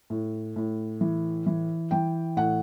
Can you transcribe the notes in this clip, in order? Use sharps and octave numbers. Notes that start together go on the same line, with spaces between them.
A2
A2
E3
E3
E3 G5
A2 F#5